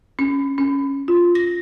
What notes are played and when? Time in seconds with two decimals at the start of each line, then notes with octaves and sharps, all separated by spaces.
0.19 C#4
0.58 C#4
1.08 F4
1.35 A#6